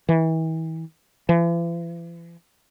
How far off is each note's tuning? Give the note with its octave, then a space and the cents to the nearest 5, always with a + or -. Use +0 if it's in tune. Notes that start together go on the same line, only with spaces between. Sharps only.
E3 -35
E3 +45